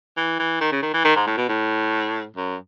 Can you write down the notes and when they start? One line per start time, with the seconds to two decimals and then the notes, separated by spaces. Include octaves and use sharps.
0.17 E3
0.39 E3
0.61 D#3
0.72 C#3
0.82 D#3
0.94 E3
1.05 D#3
1.16 G#2
1.27 A2
1.37 B2
1.49 A2
2.36 F#2